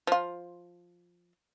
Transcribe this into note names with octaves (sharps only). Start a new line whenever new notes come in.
F3 F4